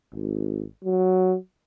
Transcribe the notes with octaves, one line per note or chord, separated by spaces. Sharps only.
G#1
F#3